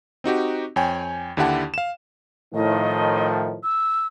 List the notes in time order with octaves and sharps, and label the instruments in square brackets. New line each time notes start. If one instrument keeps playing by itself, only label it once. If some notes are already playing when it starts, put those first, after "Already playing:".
[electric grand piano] C4 D#4 F#4 G4
F2 C#5 G5 G#5
D#2 D3 E4 G4 F#5 A5
F5 E7
[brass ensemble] A2 D#3 F3 [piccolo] D#5
[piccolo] E6